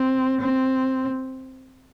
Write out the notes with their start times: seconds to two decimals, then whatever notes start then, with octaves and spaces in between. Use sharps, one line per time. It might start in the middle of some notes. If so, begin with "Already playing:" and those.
Already playing: C4
0.41 C4